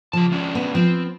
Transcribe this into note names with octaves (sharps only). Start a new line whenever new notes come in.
C#3 F3 A5
G#3 C#4 D4
B3
F3 B3 C4